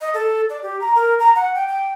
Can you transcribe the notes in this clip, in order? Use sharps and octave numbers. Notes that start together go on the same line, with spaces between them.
D#5
A4
D5
G4
A#5
A#4
A#5
F#5
G5
G5